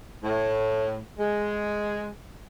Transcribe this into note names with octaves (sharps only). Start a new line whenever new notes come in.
A2
G#3